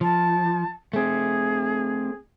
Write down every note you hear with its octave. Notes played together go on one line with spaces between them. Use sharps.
F3 A5
A3 C4 G#4